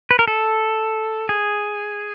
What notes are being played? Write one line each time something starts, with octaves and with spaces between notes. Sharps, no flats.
B4
A#4
A4
G#4